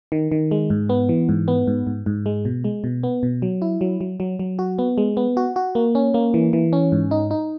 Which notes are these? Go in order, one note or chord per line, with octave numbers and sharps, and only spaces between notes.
D#3
D#3
G#3
G#2
B3
E3
G#2
B3
G#2
G#2
G#2
G#3
B2
G#3
B2
B3
B2
F#3
E4
F#3
F#3
F#3
F#3
F#4
B3
G#3
B3
F#4
F#4
A#3
C#4
A#3
E3
E3
C#4
G#2
D#4
D#4